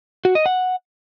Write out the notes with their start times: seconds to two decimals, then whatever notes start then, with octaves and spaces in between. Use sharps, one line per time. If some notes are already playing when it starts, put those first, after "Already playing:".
0.25 F#4
0.35 D#5
0.46 F#5